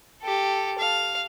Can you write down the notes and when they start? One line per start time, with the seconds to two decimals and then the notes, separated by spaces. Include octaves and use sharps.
0.22 G4 A4
0.78 F5